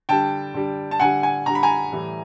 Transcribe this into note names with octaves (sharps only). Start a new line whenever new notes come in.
D3 G3 G5 A5
D3 G3
A5
D3 G3 F#5 G#5
F#5 G#5
D3 G3 A#5
B5
G#5 A#5
A2 E3 G3